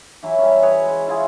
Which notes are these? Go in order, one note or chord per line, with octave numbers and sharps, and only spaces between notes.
E3 F#3 E4
G3 C#4
G#4 B4 C#5
G#3
E4 F4 G#4